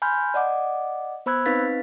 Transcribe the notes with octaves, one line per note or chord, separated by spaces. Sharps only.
G#5 B5 C6 F6 G6
D5 D#5 F#5 D6
B3 C5 B5 E6 F#6 G#6
C4 D#4 B4 F5 A6 B6